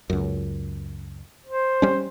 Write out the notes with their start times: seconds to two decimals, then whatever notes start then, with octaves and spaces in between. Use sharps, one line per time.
0.10 C#2 F#2
1.46 C5
1.82 G3 C#4